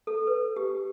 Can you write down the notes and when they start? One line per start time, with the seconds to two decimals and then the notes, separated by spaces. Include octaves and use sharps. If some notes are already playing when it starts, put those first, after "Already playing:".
0.07 A4
0.27 B4
0.56 G4